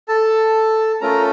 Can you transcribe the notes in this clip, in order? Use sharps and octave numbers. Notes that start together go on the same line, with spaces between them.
A4 A5
A3 C#4 F4 A4 A#4 A#5